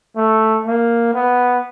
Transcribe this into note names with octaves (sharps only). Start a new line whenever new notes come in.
A3
A#3
B3